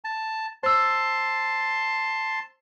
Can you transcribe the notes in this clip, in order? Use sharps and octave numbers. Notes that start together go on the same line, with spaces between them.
A5
C5 A5 C6 E6